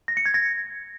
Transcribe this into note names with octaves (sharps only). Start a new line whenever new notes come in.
A#6
C#7
G#6
A#6